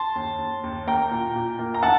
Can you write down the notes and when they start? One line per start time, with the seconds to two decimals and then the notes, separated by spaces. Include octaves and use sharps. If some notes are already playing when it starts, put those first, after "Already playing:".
Already playing: A5 C6
0.15 D#2
0.38 D#2
0.63 D#2
0.87 A#3 G5 A#5
1.11 A#2
1.36 A#2
1.59 A#3
1.74 A#5
1.83 D#3 F#5 A5